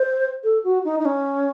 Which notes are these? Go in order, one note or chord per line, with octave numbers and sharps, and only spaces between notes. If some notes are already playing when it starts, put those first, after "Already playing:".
Already playing: C5
A4
F#4
D#4
D#4
C#4